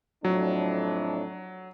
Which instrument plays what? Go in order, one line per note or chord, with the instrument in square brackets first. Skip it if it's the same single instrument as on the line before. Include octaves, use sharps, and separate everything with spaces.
[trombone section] F2 A2 D4 [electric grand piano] F#3